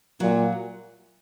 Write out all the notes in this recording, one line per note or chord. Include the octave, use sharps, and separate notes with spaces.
A#2 F#3